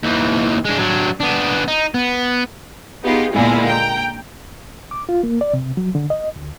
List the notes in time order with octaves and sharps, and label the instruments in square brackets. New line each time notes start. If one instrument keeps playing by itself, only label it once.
[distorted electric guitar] D#2 E3
G#3 D4
F#3 D4
B3 D4
D#4
B3
[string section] B3 D#4 F4 G4 G#4
A#2 D3 G#3 A#3 B3 E4
G5 A#5
[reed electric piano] D6
F4
A#3
D5
C3
F#3
D3
D#5
D2